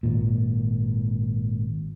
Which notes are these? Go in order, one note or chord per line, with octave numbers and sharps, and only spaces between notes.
G#1 A#2